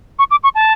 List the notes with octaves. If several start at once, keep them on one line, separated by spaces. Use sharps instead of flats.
C#6
D6
C#6
A5